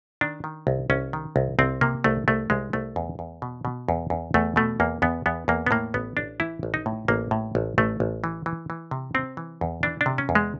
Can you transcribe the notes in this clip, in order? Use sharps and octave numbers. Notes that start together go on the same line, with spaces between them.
D#3 D4
D#3
C2
C2 C#4
D#3
C2
C2 C4
C3 A#3
C2 A3
C2 A3
C2 G#3
C2 A3
E2
E2
B2
B2
E2
E2
E2 A3
B2 A3
E2 A#3
E2 B3
E2 B3
E2 A#3
B3
A2 A#3
A1 B3
A1 D4
E3 E4
A1
D#4
A2
A1 A#3
A2
A1
A1 A3
A1
E3
E3
E3
C3
C3 C4
E3
E2
E3 D4
D4
C3
C#4
E2
G#3